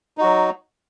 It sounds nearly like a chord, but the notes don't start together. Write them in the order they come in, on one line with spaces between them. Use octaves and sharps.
D#4 F#4 F#3